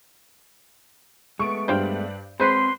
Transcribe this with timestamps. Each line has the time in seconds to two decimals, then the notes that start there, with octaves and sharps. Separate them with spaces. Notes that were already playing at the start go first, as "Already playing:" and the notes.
1.39 G#3 A3 B3 C#6 D7
1.68 G2 G3 D4 C5 F5 G5
2.40 F#3 G#3 C4 B4 C5 C6